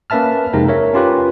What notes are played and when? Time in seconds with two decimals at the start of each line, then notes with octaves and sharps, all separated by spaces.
0.10 A#3 C#4 B4 E5 A5 F6
0.53 F2 C3 G#3 C4 D#4 A#4
0.68 A#4 C#5 E5
0.94 C#4 F4 G4 B4